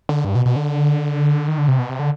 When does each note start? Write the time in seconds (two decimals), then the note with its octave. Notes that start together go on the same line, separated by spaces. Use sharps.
0.09 D3
0.25 G2
0.35 B2
0.46 B2
0.56 D3
1.48 D#3
1.58 D3
1.68 C3
1.78 B2
1.89 C3
1.99 D3